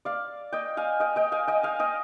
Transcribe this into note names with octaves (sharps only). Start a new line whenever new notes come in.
D5 F5
D#5 G5
F5 G#5
D#5 G5
D#5 G5
F5 G#5
D#5 G5
F5 G#5
D#5 G5